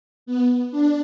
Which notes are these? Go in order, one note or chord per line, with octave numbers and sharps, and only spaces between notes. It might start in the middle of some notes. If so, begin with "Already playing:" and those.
B3
D4